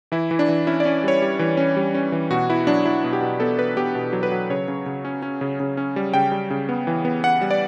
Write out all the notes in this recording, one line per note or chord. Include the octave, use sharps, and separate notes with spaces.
E3 E4
E3
D4
E3
C#4 E4
D5
C#4
G3 C#5
G3
E3
C#4
G3
C#4
E3
B2 F#4
B3 E4
F#3 D4
F#3 E4
B2
G4
B2
B3 A4
B3 B4
B3 G4
B2
F#3
B4
F#3
C#3 C#5
C#3
C#3
C#4
C#4
C#3
C#3
C#4
G3
C#3 G5
G3
C#3
B3
E3
B3
B3 F#5
G3
D5